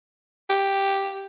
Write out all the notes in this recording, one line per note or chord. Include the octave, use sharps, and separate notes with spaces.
G4